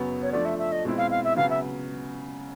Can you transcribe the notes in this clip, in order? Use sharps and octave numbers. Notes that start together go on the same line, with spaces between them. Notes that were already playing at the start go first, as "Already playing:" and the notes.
Already playing: F#2 C#3 F#3 B3
C#5
F3 A3 D4 D5
E5
E5
D#5
B2 G#3 C4 E4
F5
F5
E5
C#3 F#3 B3 F5
E5